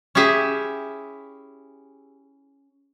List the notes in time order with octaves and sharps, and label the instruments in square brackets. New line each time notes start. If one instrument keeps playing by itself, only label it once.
[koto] C#4 E4 G4 G#4 E5